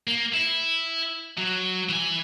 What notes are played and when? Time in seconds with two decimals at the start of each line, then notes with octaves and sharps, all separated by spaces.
0.07 A#3
0.34 E4
1.38 F#3
1.89 E3 G#5